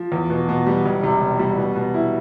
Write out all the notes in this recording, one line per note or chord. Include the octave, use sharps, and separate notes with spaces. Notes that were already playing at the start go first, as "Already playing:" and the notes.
Already playing: F3
E2
B2
B2
G3
E1
C3
E1
G3
B2
B2
E4